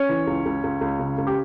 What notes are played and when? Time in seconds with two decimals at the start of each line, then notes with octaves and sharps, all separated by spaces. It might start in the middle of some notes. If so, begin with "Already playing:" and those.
Already playing: C#4 C#5
0.09 E3
0.27 C#2
0.45 C#2
0.63 C#2
0.81 C#2
0.99 C#3
1.18 C#2
1.27 G4